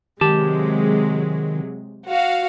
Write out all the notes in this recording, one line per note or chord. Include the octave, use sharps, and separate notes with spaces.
C3 D#3 F#3 G#3 G4 A5
F#4 F5